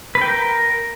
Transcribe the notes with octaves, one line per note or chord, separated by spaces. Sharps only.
B4
G5
A#4